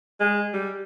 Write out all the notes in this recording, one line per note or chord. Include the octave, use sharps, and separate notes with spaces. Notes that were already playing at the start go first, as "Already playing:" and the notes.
G#3
G3